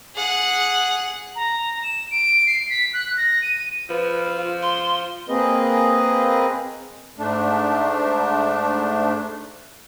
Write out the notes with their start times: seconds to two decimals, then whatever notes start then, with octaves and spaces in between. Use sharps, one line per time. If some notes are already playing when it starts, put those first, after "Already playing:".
0.15 G#4 F#5
1.36 A#5
1.83 E7
2.11 D7
2.47 C7
2.70 B6
2.93 F#6
3.17 A#6
3.42 D#7
3.90 F3 B4
4.38 F4
4.62 C6
5.29 A#3 C4 G#4 B4 D#5
7.18 G#2 A3 D4